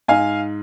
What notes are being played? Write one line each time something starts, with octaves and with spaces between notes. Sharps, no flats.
G#2 F5 G#5